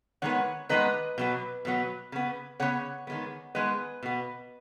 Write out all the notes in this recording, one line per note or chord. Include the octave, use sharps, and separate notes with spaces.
D#3 G#3 B3 C#5 F#5
D#3 G#3 B3 B4 D#5
B2 F#3 B3
B2 F#3 B3
C#3 B3
C#3 B3 C#5 F#5
D#3 G#3 B3
D#3 G#3 B3 B4 D#5
B2 B3